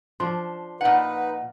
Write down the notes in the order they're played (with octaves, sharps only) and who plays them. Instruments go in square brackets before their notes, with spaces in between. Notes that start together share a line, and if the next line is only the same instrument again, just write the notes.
[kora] F3 D4 [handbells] C6
[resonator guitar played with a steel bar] A#2 F#5 [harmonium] D#4 B4